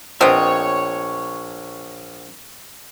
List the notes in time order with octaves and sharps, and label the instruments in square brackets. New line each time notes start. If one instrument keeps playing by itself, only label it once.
[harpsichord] A#1 [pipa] B3 C4 [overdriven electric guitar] C#5 [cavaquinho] D#5 G5 D#6